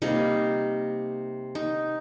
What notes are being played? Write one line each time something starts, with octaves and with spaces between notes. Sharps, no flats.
C3 G3 A#3 D#4
D#4